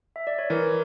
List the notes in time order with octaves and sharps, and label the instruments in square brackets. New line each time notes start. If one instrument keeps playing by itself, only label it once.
[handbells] E5
D5
C#5
[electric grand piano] E3 [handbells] A#4